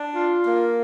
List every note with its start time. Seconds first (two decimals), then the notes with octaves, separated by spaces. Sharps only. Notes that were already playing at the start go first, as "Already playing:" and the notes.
Already playing: D4
0.14 F4
0.44 A#3